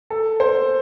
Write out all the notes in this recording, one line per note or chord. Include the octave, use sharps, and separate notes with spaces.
A4
C5